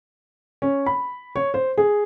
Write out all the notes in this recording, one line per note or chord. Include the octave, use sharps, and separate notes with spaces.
C#4
B5
C#5
C5
G#4